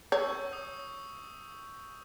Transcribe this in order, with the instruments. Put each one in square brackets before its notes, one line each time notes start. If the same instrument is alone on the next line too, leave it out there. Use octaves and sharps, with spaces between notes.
[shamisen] C#5 [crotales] C#6 E6 G6
[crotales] D#6